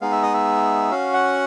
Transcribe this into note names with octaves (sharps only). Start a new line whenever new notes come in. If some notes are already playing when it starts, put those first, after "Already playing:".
G#3 B3 D#4 F5
E5
D#5
E5
C#4 F#4 F5
F#5